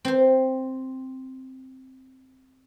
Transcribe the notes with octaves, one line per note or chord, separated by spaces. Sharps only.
C4 C5